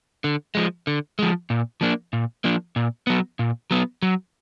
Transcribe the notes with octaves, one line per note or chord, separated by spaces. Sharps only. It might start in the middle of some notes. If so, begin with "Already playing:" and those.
D3
F3 G#3
D3
F3 G#3
A#2
F3 A#3 D4
A#2
F3 A#3 D4
A#2
F#3 B3
A#2
F#3 B3
F#3